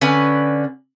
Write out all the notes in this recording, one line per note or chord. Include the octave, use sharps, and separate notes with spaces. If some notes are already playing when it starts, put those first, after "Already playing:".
D3 C#4 B4 G#5